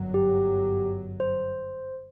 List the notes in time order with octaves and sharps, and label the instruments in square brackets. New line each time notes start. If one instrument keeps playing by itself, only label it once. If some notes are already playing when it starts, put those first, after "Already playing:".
Already playing: [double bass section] G1 F#2 F#3
[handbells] G4
C5